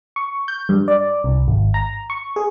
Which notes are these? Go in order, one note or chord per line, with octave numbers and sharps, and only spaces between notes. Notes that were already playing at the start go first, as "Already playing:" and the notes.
C#6
G6
G2
D5
C2
G#1
A#5
C#6
G#4